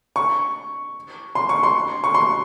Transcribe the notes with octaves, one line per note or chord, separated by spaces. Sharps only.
C#6
C6
C#6
C6
C#6
C6